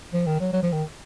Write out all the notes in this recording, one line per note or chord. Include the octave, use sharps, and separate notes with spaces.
F3
D#3
F#3
F#3
F3
D#3